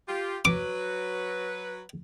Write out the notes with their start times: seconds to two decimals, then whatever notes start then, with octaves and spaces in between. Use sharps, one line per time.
0.08 F4 G4
0.45 F#3 B4 D6